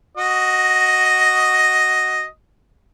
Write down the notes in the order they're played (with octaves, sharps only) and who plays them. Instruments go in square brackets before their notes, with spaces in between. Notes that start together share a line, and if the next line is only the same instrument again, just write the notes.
[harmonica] F#4 D#5